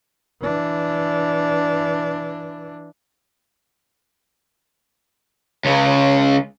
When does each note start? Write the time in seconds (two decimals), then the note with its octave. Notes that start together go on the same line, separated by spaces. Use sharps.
0.42 E3 D4
5.65 C#2 C#3